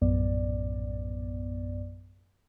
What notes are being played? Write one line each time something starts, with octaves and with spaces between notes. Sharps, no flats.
A#1 F#2 A2 B3 D5